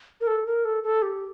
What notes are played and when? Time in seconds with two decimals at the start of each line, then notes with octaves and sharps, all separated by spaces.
0.21 A#4
0.27 A4
0.46 A#4
0.65 A4
0.83 A4
1.02 G4